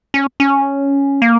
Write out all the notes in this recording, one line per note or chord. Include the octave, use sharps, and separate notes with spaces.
C#4
C#4
A#3